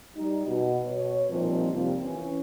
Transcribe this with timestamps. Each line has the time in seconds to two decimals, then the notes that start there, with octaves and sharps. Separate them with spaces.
0.15 G3 D#4
0.46 B2
0.86 B2 C#5
1.29 A#2 D#3 F3 G3 C4
1.72 F2 C3 F3 G3 A#3 C4
2.03 E3 C#4